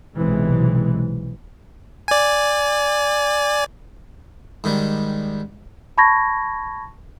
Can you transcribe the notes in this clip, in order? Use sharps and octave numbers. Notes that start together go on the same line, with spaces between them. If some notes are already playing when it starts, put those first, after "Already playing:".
B1 C3 E3 G#3
D5 G#5
G#2 D#3 G3
A5 B5 C#6 G#6 A#6